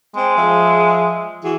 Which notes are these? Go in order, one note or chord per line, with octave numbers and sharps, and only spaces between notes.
G#3 C4
F3 G#4 E5
E3 F#4 G#4